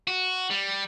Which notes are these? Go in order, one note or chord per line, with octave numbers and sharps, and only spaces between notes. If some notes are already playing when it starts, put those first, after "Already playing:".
F#4
G3